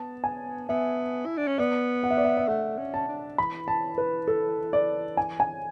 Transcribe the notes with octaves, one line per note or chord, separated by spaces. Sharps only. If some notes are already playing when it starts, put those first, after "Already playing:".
Already playing: B3 A5
G#5
B3 E5
E4
D4
C#4
B3 D5
F#5
E5
D5
E5
E5
A3 F#5
C#4
A5
D4
E3 B5
A5
B4
A4
D5
G#5
G#5